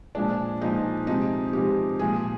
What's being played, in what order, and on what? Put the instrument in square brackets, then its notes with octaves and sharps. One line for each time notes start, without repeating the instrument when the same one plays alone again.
[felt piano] A#2 F3 G#3 D4
A#2 F3 G#3 D#4
C3 F3 G#3 D#4
C3 F3 G#3 G4
A#2 F3 G#3 G#4